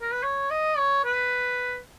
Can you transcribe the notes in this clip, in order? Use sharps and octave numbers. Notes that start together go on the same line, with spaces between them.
A#4
B4
C#5
D#5
C#5
B4